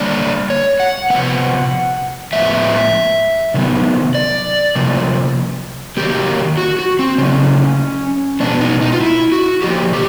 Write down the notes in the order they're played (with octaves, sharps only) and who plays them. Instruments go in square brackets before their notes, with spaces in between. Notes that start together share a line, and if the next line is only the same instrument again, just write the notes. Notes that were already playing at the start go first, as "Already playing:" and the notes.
Already playing: [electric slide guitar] D3 G3 A#3 D5
C#5
F#5
C3 F3 G#3 B3 F#5
A2 F3 G#3 B3 E5
C3 D#3 F#3 B3
D5
C3 F3 A#3
D#3 F#3 A#3 G4
F#4
F#4
C4
C#3 F#3 A3 C#4
B2 G#3 B3 D4
D#4
D#4
F4
E4
F#4
A2 F3 A#3 G4
G4